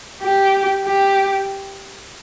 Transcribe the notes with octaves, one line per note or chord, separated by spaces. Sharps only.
G4
G4